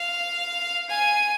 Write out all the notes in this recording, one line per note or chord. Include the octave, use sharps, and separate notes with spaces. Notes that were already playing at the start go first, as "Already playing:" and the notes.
Already playing: F5
G#5